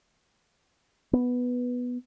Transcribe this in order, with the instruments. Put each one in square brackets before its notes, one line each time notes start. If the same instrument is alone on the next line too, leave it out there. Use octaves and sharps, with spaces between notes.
[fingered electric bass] B3